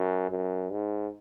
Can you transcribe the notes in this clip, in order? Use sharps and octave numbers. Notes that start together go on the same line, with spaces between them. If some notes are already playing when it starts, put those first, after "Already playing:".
Already playing: F#2
F#2
G#2